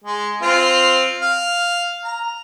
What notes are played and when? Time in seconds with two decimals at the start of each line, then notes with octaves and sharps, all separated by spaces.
0.04 G#3
0.42 C4 F4
1.21 F5
2.04 A#5